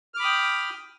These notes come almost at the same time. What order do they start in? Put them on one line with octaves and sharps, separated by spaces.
F6 D6 B5 D#6 G5